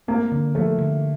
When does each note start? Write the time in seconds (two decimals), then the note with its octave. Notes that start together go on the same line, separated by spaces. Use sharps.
0.08 A#3 C4
0.32 D3
0.55 F3 A3
0.78 D3